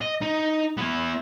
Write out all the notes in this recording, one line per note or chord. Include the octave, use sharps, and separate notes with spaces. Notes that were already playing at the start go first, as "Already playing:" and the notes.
D#5
D#4
B3 E4